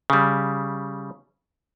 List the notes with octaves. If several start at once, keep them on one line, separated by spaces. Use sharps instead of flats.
C#3 G3